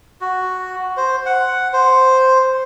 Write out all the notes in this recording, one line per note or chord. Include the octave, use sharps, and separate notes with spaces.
F#4
C5
F#5
C5